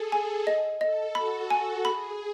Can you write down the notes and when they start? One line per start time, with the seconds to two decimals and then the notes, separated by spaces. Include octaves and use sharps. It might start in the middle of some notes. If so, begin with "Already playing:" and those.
Already playing: G#4 A4
0.12 G#5
0.47 D#5
0.81 A4 D#5
1.15 F#4 B5
1.50 F#4 G#5
1.84 G#4 B5